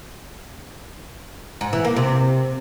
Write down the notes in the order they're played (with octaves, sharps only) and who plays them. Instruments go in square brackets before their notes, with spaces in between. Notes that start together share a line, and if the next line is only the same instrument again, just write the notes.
[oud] G#2
E3
A#3
C3